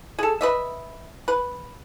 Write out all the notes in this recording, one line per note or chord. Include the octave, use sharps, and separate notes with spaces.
G#4 A4
B4 D#5 E5
B4